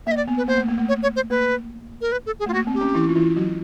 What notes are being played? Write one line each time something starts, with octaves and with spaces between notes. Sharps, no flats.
A#3 D#5 E5
D5
B3
B4
A#3 C5
A3
A#3
A3
C#5
C#5
C5
A#3 B4
A#4
B4
A4
G#4
A3 F4
A#3 F#4
C4
G4
C#4
E3 E4
F4
E3 E4
F#3 F#4